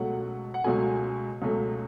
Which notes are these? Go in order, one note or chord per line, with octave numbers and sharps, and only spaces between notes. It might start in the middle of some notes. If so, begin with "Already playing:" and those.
Already playing: C#2 B2 F#3 A3 F#5
F#5
C#2 B2 F#3 A3 G#5
C#2 B2 F#3 A3